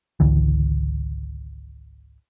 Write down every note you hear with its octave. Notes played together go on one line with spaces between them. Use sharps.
G#1 C#2 D3 E3